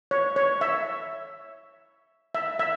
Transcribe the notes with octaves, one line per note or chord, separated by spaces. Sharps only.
C#5
C#5
E5
E5
E5